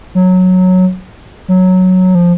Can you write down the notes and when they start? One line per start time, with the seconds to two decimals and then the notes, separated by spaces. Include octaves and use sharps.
0.15 F#3
1.48 F#3
2.15 F3